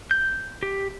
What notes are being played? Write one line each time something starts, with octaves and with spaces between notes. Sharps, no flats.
G6
G4